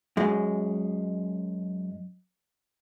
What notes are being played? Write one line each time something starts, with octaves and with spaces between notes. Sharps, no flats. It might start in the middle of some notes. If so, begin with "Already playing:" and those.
F#2 G#3